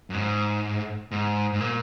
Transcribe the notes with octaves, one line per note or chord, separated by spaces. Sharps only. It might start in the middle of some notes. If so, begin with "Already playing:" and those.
F#2
G#2
G#2
G#2
A#2